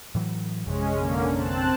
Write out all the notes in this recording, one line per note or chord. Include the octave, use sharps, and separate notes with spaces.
A2 E3 F#3
A1 F2 C3 G#3 C#4
D3 A#3 C#4
C4 A5 F#6